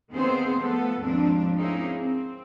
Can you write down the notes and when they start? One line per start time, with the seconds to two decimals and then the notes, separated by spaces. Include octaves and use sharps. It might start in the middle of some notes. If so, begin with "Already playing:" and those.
0.10 D#2 D#3 B3 C4 G#4 C5
0.58 F3 A3 B3 A4
0.99 D#2 G#2 F3 C4 D4
1.57 A#3 C4 C#4 D#4 E4 G#4
1.97 C4